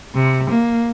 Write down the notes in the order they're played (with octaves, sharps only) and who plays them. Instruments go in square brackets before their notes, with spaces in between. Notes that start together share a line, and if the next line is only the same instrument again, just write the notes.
[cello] C3
A#3